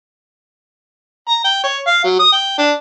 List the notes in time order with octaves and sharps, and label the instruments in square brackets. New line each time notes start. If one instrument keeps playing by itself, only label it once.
[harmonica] A#5
G5
C#5
F5
F#3
D#6
G5
D4